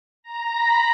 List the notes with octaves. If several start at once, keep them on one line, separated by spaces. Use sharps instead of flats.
A#5
B5